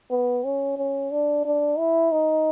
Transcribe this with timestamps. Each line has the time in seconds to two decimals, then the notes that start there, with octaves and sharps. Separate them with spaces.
0.11 B3
0.44 C#4
0.77 C#4
1.11 D4
1.45 D4
1.78 E4
2.12 D#4